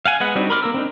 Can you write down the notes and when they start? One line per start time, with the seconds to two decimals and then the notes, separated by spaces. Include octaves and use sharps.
0.05 F5 F#5 G#5
0.20 G#3 B3 F#5
0.35 G3 C4 D4 D#4 F#4
0.50 A#4 B5 C6 D6 F6
0.62 A#3 A#4 E6
0.74 C4 D4 D#4